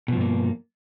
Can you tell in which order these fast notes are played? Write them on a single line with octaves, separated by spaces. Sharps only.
B2 F3 G2 A#3